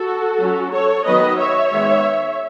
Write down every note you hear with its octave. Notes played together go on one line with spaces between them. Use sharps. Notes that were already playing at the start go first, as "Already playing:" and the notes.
Already playing: F#4 A4
F#3 C#4
A4 C#5
D#3 F#3 B3 B4 D#5
C#5 E5
D#3 G#3 B3